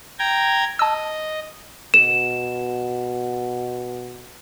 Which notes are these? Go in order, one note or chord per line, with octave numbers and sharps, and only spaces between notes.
G5 A#5 G#6
D#5 A5 E6
B2 E7